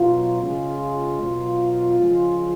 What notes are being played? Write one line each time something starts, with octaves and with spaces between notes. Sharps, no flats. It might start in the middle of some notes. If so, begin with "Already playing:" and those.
Already playing: B2 F#3 F4
C#3 G#3
B2 F#3
C#3 F3 G#3